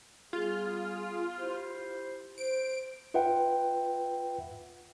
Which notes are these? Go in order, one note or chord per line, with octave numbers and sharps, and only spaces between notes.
G3 B3 F4 G#4
E4 G4 C5
C5 D7
F4 B4 E5 F#5 G5